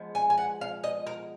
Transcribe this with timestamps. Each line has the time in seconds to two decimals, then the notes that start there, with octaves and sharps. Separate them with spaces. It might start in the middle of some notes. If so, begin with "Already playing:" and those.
Already playing: F3 G#3 B3
0.15 G#5
0.30 G#5
0.38 F#5
0.61 F5
0.84 D#5
1.07 A#4